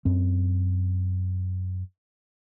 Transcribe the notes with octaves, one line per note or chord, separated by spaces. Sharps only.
F#2 C4